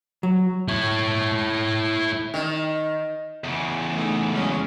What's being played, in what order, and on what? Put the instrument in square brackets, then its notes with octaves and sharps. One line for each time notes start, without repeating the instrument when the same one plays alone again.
[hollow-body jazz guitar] F#3
[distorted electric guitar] E4 C#5
[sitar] D#3
[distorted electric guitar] E2 C#3
[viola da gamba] A3 D#4
F#3 G#3 C#4